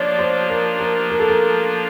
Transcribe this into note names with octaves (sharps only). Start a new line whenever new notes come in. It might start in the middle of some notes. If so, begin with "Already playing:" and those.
Already playing: F3 A#3 D4 F4 C#5 D5
C5
A#4
A#4
A#4
A4
A#4